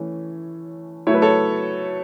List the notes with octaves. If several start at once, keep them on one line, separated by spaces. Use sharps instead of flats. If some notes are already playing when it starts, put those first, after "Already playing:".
Already playing: E3 A3 C#4
F#3 A3 E4 C#5
B4
A4 C#5